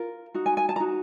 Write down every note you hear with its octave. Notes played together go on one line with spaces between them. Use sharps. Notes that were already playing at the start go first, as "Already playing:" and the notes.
Already playing: F4 A#4
D#4 F#4
G#5
G#5
A5
A#5
D#4 F#4